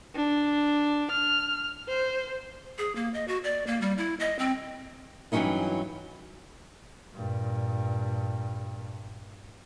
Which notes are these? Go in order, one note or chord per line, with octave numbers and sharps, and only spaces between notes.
D4
F6
C5
G#4
A#3
D#5
F#4
D5
A#3
G3
E4
D#5
C4
G2 E3 F#3 C#4 D#4 E4
G2 A#2